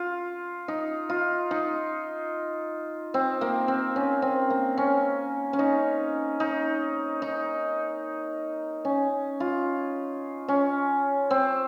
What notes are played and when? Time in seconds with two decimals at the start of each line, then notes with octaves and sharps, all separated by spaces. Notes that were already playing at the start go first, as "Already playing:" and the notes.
Already playing: F4
0.68 D#4
1.10 F4
1.51 D#4
3.14 C4
3.41 A#3
3.68 C4
3.96 C#4
4.22 C4
4.50 A#3
4.78 C#4
5.53 C#4
5.59 D#4
6.40 D#4
7.22 D#4
8.85 C#4
9.40 F4
10.48 C#4
11.31 C4